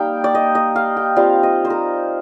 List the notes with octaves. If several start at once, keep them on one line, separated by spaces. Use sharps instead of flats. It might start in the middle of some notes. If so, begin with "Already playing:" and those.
Already playing: G3 A#3 D#4 F5 G5
D5
D#5
D#5
F5
G5
G3 C4 F4 F5
D#5
C5
A#4